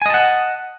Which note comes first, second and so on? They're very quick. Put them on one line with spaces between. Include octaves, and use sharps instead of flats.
G#5 D#5 A5 F#5